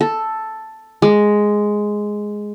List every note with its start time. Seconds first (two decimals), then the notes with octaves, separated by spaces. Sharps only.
0.01 A4
1.02 G#3